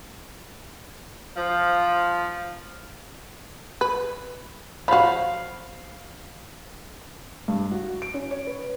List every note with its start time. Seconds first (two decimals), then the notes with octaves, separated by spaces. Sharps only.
1.36 F3
3.81 B4
4.88 F3 F#4 F5 B5
7.48 G2
7.71 F#4
8.02 D7
8.14 C#4
8.31 C#5
8.47 B4